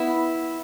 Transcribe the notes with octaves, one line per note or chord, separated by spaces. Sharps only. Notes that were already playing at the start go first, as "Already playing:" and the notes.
Already playing: B3 E4